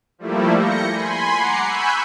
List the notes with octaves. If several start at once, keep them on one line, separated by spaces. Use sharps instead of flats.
F3 G3 A3 A#3 E4
G6 A#6 C#7
G#5 B5 C6
F#5 A#5 D6 C7 C#7
G#5 B5 C#6 E6 F#6 G6